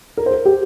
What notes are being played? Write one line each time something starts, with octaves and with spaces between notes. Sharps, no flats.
A#4
C5
A#4
G4